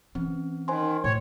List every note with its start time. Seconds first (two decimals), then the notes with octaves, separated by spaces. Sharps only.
0.15 E3 C4 C#4
0.68 D#3 C5 G#5 C6
1.04 A2 C#5